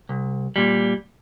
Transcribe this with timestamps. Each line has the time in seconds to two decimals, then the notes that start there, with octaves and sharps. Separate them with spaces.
0.09 C2
0.56 A#2 G3